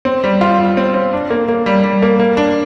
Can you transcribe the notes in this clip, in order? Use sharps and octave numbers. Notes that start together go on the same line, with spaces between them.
C4
G3
F4
G3
C4
C4
D4
A#3
A#3
G3
G3
A#3
A#3
D4